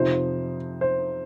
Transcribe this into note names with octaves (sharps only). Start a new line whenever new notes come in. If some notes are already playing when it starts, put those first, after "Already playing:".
Already playing: F2 C3 F3 D#4 C5
C5